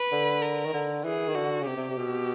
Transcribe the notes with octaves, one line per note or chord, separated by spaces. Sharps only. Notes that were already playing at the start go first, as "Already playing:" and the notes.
Already playing: B4
D3
A#4
D#3
D3
E3 G#4
D#3
D3 F#4
C#3
C3 G4
C3
C3
B2